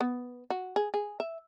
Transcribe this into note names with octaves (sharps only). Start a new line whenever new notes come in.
B3
F#4
G#4
G#4
E5